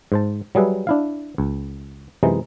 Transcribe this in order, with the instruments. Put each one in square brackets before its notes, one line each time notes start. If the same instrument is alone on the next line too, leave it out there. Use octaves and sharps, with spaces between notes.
[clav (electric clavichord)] G#2 C5 A5
F#3 G3 G#4 B4 E5
D4 E4 F5
C#2
F#2 C3 E3 G#3 D#4